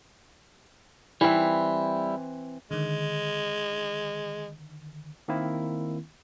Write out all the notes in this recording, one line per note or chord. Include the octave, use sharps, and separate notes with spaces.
E3 G3 C4 E4
D3 D#3 G#3
D#3 A#3 C4 E4